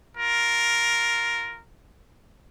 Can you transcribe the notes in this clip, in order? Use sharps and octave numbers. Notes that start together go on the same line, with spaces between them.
F4 A#4